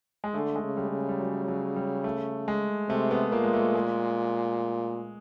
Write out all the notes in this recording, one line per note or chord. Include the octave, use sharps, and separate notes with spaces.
G#3
D3 A3
G#3
C#3
G3
C#3
G3
F#3
F#3
G3
A3
G#3
C3 A3
B3
A#2 A#3
G#3
A3
G#3